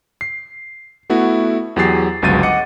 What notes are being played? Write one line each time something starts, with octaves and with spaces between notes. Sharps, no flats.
C7
A3 B3 E4 F#4
E2 F#3 G4 G#4 A6 C7
G1 C#2 F#3 A6 D#7
D#5 F#5 D6 C#7